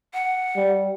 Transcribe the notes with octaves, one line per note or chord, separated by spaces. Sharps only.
F#5
G3